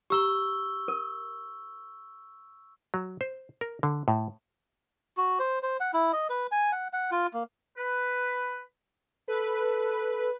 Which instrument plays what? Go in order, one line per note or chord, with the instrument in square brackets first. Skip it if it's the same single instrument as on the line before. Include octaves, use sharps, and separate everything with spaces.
[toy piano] G4 A#5 [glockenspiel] C#6 E6 G7
[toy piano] A#4
[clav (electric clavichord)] F#3
C5
A#4
D3
A2
[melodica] F#4
C5
C5
F#5
E4
D#5
B4
G#5
F#5
F#5
F4
A#3
[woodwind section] B4
[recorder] A4 [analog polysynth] B4